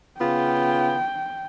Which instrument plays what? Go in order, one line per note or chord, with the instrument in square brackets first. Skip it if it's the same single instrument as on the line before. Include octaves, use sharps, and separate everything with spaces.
[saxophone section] C#3 B3 F4 [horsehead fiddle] G5